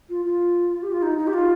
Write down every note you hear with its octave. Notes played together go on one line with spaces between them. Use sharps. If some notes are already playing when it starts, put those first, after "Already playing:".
F4
F4
G4
F4
D#4
D#4
G4
F4